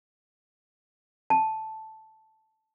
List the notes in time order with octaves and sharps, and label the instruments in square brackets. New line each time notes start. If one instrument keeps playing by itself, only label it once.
[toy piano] A5